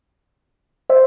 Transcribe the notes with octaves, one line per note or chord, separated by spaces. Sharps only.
C5 E5